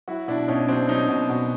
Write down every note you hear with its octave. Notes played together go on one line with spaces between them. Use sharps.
F#3 E4 F#4
B2 D4 E4
B2 C#4 D#4
F#3 C4 D4
F#3 C#4 D#4
B2
B2